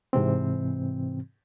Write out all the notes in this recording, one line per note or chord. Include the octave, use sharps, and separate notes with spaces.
G#2 C3 E3 C4